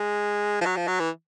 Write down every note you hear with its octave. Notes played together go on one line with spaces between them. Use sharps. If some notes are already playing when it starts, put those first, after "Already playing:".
Already playing: G#3
F3
F#3
F3
F#3
E3